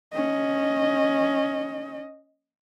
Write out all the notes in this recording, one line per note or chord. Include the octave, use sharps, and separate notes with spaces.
C#4 D#5